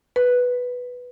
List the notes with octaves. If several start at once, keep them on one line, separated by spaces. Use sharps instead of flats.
B4